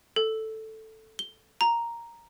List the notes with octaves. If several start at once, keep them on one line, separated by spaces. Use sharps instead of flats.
A4
G7
A#5